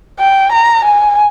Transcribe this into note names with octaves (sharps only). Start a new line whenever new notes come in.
G5
A#5
G#5